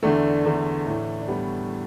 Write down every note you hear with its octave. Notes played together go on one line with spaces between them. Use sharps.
E2 D3 A3 D4
E2 D3
A2 E3
D4
G3 B3